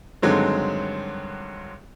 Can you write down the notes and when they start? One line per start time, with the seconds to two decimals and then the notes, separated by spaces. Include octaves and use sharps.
0.22 G2 D3 D#3 F#3 G#3 C4